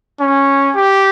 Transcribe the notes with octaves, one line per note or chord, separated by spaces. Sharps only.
C#4
G4